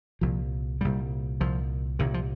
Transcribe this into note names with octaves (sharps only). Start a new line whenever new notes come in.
C2 A#2 F3
C2 A#2 G3
C2 A#2 F3
C2 A#2 D#3
F3